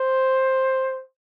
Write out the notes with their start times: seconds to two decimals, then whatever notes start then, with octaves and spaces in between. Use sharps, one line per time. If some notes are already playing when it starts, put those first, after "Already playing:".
Already playing: C5